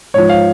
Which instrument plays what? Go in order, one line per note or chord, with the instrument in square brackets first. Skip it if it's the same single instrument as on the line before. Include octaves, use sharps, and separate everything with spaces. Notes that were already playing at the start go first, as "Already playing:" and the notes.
[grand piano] G#2 F3 C#5
F5